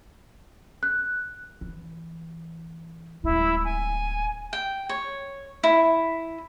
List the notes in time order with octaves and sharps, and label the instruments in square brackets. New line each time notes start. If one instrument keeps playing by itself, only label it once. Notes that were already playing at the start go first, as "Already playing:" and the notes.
[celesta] F#6
[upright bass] E3
[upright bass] D1 G#3 [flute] E4
[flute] G#5
[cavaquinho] G5
C#5
E4